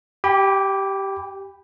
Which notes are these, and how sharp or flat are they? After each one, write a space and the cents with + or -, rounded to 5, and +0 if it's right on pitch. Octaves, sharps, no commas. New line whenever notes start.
G4 -10 G5 +40 B5 +0